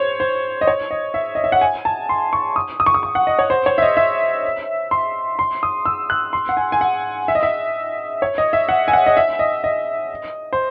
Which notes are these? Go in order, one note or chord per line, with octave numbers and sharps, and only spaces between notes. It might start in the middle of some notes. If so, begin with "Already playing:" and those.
Already playing: C5 C#5
C5
D#5
C#5
D#5
E5
D#5
E5
F#5
G#5
A5
C6
C#6
D#6
D#6
C#6
D#6
C#6
F#5
D#5
C#5
C5
C#5
E5
D#5
E5
C6
C6
D#6
E6
F#6
C6
F#5
G#5
G#5
F#5
E5
D#5
E5
C#5
D#5
E5
F#5
G#5
F#5
D#5
E5
D#5
D#5
C5